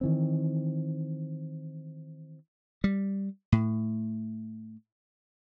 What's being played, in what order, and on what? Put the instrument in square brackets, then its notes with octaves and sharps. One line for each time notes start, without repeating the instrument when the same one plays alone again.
[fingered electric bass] D#3 E3 C4
[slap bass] G3
A2